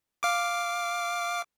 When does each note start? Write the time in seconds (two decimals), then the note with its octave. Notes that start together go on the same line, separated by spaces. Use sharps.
0.23 F5 D6